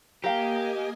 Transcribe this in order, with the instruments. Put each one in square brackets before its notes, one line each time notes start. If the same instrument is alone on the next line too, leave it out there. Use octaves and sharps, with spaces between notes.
[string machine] A#3 D#5 G#5 [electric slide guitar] G4 [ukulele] A#4 F5 G5